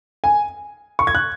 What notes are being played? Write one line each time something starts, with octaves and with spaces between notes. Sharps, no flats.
G#5
C#6
G#6
F#6